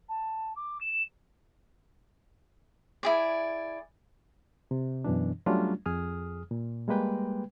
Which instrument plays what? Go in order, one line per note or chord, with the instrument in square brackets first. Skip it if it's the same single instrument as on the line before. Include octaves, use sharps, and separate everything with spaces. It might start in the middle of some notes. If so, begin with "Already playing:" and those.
[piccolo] A5
D6
E7
[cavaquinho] E4 G#4 D5
[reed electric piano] C3
F#2 B2 E3 D4
F#3 G3 A3 C#4 D4 F4
F2 G#4 D#6 F6
A#2
G3 G#3 A#3 B4 G5